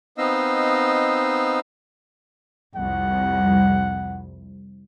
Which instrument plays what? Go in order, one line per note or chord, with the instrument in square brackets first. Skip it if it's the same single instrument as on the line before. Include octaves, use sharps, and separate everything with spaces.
[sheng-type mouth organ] B3 C4 D#4 D#5 F5 E6
[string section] C2 F2 [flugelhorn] F#5